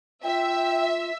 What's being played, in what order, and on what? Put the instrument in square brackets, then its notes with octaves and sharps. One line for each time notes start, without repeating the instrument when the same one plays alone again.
[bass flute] F4 [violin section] E5 [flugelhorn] G5